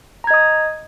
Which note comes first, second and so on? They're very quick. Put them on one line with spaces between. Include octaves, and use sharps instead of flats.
A#5 G#6 D#5 D#6